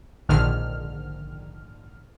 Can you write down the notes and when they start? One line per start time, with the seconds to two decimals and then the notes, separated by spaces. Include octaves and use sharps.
0.29 A#1 G#2 D3 D#3 F6